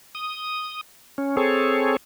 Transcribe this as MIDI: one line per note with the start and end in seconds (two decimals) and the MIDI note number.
0.15 0.81 87
1.18 1.36 61
1.37 1.97 60
1.37 1.97 68
1.37 1.97 69
1.37 1.97 73